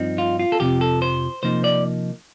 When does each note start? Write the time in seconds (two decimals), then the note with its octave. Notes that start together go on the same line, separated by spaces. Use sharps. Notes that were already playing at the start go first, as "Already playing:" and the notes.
Already playing: G2 F3 C4 D#4
0.18 F4
0.39 F4
0.52 A4
0.60 F2 C3 F3 G4
0.81 A4
1.02 C5
1.43 C3 F3 A#3 D#4 C5
1.64 D5